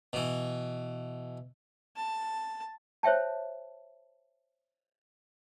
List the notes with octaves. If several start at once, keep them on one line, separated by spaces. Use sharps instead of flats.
B2 E3
A5
C5 C#5 E5 G5 A5